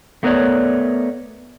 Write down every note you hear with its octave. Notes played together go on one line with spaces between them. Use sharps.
A3 B3 A#4 B4 C#5 D5